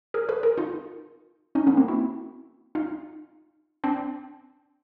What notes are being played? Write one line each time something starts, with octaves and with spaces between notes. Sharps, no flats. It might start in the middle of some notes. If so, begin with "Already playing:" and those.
G#4 A#4
A4 B4
G#4 A#4
D#4 F4
C#4 D#4
B3 C#4
A#3 C4
E4 F#4
D#4 F4
C4 D4